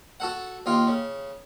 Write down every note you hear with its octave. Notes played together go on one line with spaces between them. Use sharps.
F#4 A4 F#5
D#2 F4 G4
C#3